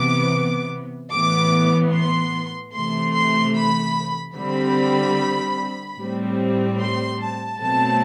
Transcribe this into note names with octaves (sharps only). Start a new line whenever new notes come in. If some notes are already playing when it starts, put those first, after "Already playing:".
Already playing: C3 E3 B3 D6
A2 E3 B3 D6
C6
C3 E3 A3 C6
C6
B5
D3 G3 C4 B5
A2 G3 C4
C6
A5
B2 F#3 A3 C4 A5